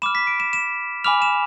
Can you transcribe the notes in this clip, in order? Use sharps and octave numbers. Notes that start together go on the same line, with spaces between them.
B5 D6 F6 E7
B6
D7
E7
E7
G#5 B5 D6 F6 F7
E7